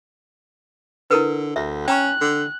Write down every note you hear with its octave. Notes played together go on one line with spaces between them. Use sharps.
D3 E4 A#4 B4
D2 E5
C#4 G5 A#5 C#6 F#6
D3